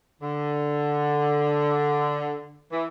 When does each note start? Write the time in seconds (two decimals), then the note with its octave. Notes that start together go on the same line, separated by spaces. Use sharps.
0.22 D3
2.72 E3